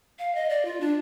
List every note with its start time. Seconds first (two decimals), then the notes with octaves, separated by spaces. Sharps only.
0.19 F5
0.35 D#5
0.50 D5
0.65 F4
0.81 D4